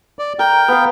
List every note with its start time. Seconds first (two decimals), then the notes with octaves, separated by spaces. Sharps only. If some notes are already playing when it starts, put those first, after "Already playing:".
0.19 D5
0.39 A#4 G5
0.68 B3 F5